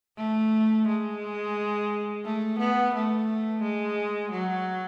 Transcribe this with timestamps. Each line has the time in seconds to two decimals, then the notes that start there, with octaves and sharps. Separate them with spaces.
0.17 A3
0.87 G#3
2.25 A3
2.60 B3
2.94 A3
3.63 G#3
4.32 F#3